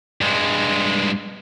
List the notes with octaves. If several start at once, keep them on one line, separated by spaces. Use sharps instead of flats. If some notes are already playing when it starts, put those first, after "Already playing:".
G2 G#3